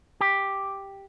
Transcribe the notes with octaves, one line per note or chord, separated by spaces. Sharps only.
G4